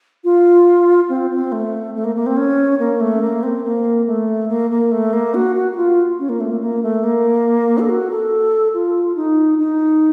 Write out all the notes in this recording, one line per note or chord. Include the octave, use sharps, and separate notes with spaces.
F4
C4
C4
A3
A3
A#3
A#3
C4
C#4
A#3
A3
A#3
C4
A#3
A3
A#3
A#3
A3
A#3
F#4
F#4
F#4
F4
C#4
A#3
A3
A#3
A#3
A3
A#3
A4
F#4
A4
F4
D#4
D#4